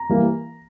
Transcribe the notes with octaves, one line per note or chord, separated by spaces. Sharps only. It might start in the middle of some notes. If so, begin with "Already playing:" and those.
Already playing: A#5
E3 G3 A#3